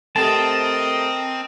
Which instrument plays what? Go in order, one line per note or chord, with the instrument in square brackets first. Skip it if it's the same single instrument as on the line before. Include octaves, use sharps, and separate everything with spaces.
[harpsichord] A2 C3 [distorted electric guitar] C4 [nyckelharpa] A#4 D#5 [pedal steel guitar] A5